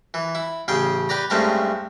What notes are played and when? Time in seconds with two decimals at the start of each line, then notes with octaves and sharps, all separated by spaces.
0.14 E3
0.35 E4
0.68 A1 C#3 G#4 G5
1.09 G4 B4 D5 A#5
1.30 G2 G#3 A3 C4 C#4 A#5